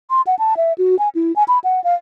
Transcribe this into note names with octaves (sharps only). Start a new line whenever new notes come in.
C6
F#5
A5
E5
F#4
G#5
E4
G#5
B5
F#5
F5